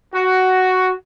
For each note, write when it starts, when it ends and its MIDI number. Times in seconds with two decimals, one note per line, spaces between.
0.14 0.92 66